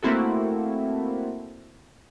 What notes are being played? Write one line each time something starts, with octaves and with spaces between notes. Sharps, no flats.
A3 A#3 C4 E4 F#4 A4